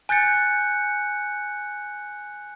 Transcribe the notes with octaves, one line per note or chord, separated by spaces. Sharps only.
G#5 F#6 G6 A6 C#7